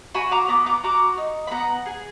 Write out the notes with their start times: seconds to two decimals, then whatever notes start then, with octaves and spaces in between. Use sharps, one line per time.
0.14 F#4 G#5 B5
0.31 A#5 D6
0.48 B3 A#5 D6
0.66 A#5 D6
0.83 F#4 A#5 D6
1.18 D#4
1.47 B5
1.51 B3 F#5 A#5
1.86 G#4